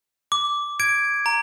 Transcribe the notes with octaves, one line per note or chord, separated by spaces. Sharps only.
D6
G#6 D7
A#5